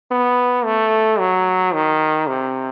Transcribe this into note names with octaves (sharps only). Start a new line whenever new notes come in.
B3
A3
F#3
D#3
C3